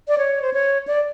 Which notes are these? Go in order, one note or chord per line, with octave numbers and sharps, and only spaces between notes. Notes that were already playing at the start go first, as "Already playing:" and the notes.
D5
C#5
C5
C#5
D5